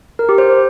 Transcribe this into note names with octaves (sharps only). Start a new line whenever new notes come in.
A#4
G4
C5